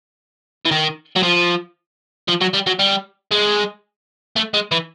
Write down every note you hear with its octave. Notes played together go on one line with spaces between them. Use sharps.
E3
D#3
F#3
F3
F3
F#3
G3
F#3
G3
G#3
A3
G#3
E3